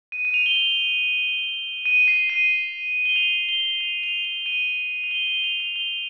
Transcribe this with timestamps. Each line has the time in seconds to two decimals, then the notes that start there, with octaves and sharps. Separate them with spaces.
0.12 D#7
0.25 D#7
0.34 F7
0.46 G7
0.56 F7
1.86 D#7
2.08 C7
2.30 D#7
3.05 G7
3.16 F7
3.49 G7
3.81 F7
4.03 F7
4.25 F7
4.46 D#7
5.04 F7
5.11 G7
5.27 G7
5.44 F7
5.60 F7
5.76 G7